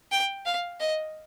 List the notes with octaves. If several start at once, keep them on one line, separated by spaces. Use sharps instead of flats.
G5
F5
D#5